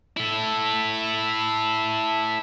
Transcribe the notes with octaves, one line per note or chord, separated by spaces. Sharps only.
E4 A4